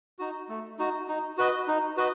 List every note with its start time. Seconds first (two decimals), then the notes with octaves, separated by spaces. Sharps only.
0.19 D#4 F#4
0.49 A3
0.79 D#4 F#4
1.08 D#4
1.37 F#4 B4 D#5
1.68 D#4
1.97 F#4 B4 D#5